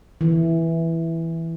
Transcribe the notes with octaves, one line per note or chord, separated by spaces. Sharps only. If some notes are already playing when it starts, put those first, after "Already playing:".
E3